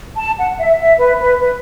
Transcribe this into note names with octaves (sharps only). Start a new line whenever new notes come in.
A5
F#5
E5
E5
B4
B4
B4